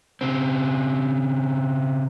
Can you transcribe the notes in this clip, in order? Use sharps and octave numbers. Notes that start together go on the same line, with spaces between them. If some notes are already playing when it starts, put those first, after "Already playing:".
C#3 C4